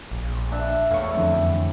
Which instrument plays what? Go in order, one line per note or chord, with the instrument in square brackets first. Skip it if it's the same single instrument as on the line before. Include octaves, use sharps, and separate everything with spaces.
[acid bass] A#1
[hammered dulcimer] D4 E5
[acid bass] E2 [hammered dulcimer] A2 [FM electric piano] F5 C#6
[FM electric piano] F2 D3 E3